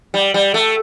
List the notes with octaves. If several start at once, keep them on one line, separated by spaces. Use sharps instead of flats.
G3
G3
A3